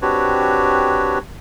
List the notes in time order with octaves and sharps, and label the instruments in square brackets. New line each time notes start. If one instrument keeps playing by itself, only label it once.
[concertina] C4 D4 F#4 G4 B4 C#5